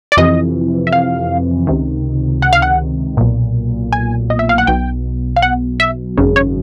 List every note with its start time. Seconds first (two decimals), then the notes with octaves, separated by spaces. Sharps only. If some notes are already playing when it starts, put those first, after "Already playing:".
0.12 D5
0.17 F2 C3 E3 D#5
0.87 E5
0.92 F5
1.67 C#2 C3 D#3
2.42 F#5
2.53 F5
2.62 F#5
3.17 B1 A#2
3.93 G#5
4.30 D#5
4.39 E5
4.49 F5
4.58 F#5
4.67 B1 B2 G5
5.36 F5
5.42 F#5
5.80 E5
6.17 G#1 F#2 C#3
6.36 C#5